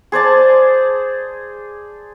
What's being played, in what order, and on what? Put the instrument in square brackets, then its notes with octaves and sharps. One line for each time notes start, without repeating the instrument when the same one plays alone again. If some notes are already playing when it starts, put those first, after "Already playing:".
[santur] G#4 C5 D5 A5